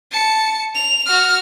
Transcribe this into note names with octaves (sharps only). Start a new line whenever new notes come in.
A5 C#7
F7
F#4 F6